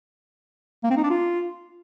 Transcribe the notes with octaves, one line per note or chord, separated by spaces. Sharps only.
A#3
C4
D#4
D4
F4